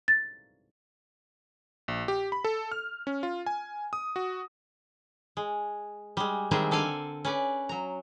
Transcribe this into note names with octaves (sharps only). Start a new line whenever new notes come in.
A6
A#1
G4
B5
A4
F6
C#4
F4
G#5
D#6
F#4
G#3
G3 G#3
D#3 G3 G#3 C4 G#4 E5
D3 A4 D5 F5 G#5
C#4 B4 D5
F#3 A#5